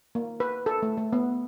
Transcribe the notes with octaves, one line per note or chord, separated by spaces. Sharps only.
A#3
B4
A4
A3
A3
B3